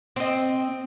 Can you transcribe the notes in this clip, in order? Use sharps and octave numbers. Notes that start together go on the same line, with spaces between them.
C4 D#5